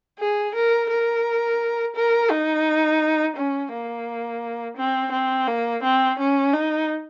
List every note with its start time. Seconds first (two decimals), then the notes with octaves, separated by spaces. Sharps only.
0.19 G#4
0.55 A#4
0.90 A#4
1.96 A#4
2.31 D#4
3.37 C#4
3.72 A#3
4.78 C4
5.12 C4
5.47 A#3
5.83 C4
6.19 C#4
6.53 D#4